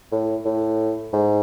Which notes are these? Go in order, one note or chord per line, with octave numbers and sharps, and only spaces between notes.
A2
A2
G#2